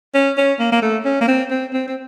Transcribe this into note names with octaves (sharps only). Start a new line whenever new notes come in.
C#4
C#4
A#3
A#3
A3
C#4
A#3
C4
C4
C4
C4